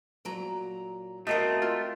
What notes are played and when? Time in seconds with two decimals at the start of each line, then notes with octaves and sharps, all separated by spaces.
0.25 A#2 F#3 A#5
1.27 A3 C4 F#4 A#4 D#5 F5
1.62 F4